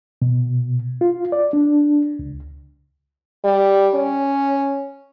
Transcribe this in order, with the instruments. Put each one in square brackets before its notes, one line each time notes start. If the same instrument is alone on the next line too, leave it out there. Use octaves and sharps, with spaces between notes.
[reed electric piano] B2
F4
D5
D4
C#2
[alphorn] G3
C#4